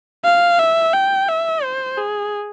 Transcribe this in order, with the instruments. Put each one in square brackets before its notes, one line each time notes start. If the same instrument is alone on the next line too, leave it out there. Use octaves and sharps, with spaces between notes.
[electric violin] F5
E5
G5
E5
C5
G#4